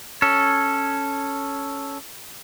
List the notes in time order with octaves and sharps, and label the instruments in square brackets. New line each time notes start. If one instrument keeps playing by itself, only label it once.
[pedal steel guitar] C#4 A4